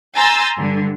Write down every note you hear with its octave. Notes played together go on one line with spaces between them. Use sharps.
G#5 A#5 C6 E6 G6 A6
G2 D3